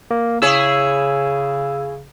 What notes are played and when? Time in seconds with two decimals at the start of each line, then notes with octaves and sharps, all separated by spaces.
0.11 A#3
0.42 C#3 E4 G#4 C#5 E6